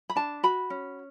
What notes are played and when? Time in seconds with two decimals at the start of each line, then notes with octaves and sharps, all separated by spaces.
0.10 B5
0.16 D4 A5
0.43 F#4 B5
0.70 C#4